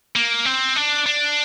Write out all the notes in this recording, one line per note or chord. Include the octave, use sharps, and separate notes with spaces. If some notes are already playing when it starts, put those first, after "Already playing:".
A#3
C4
D4
D4